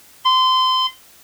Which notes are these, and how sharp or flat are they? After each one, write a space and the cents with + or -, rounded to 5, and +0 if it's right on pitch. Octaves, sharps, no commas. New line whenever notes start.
C6 -25